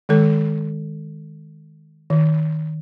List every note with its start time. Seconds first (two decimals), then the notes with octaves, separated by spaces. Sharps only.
0.09 D#3 G#3 A4
2.10 D#3